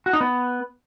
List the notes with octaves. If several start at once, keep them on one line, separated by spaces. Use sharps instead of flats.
F#4
D#4
B3